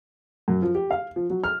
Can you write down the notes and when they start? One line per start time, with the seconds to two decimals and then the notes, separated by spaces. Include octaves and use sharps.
0.48 F#2
0.62 F3
0.75 G4
0.91 F5
1.16 F3
1.30 F#3
1.44 F6